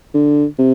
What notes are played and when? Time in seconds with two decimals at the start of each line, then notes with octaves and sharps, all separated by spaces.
0.14 D3
0.59 C3